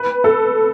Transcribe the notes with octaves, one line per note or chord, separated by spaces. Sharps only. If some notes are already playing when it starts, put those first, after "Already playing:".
Already playing: B4
A4